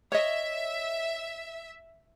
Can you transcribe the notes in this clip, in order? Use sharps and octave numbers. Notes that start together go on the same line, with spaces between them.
C#5 D#5 E5